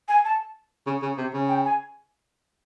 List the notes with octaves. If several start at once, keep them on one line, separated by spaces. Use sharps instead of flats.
G#5
A5
C#3
C#3
C3
C#3
G5
G#5